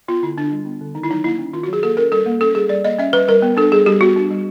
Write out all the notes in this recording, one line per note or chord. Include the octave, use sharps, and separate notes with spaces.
B3 F4
D3 E4
D3 D4
G3
B3
D3
D#3 D#4
E4
F#3 D#4
A#3 E4
C#4
D#3 F4
F#4
F#3 G#4
A#3 A4
C#4 A#4
G3 A4
A#3
C#4 A4
G3 G#4
G3 D5
A#3 D#5
C#4 E5
G3 B4
G3 A#4
B3
D4 A4
G3 G#4
G3 G4
B3 F#4
D4
G3